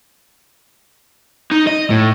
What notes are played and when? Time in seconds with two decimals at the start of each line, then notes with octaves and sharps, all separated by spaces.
1.51 D#4
1.67 D#5
1.90 A2